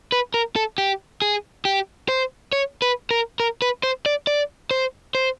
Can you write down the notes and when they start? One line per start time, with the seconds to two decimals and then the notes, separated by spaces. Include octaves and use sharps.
0.12 B4
0.34 A#4
0.56 A4
0.78 G4
1.22 G#4
1.65 G4
2.09 C5
2.53 C#5
2.82 B4
3.11 A#4
3.40 A#4
3.62 B4
3.83 C5
4.06 D5
4.27 D5
4.71 C5
5.15 C5